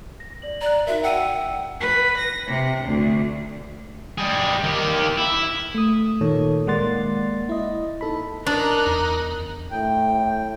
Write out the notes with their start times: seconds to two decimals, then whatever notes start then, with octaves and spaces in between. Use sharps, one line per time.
0.20 A#6
0.42 D5 F#7
0.61 D5 A#5 F#6
0.87 D#4 F#4 A#4 E5
1.04 F#5 G5 E6 D#7
1.78 B4
2.16 A#6
2.47 C3
2.83 D2
4.18 G3 G#4
4.64 D#3 G4
5.18 E4
5.75 A3 D#6
6.21 A#2 D#3 A4 C#5
6.67 G#3 A#3 D5 F#5 C6 A6
7.49 E4 D#5
8.01 D#4 A4 B5
8.46 D4 D#4 A#4 F#6
8.86 E2
9.72 A2 G5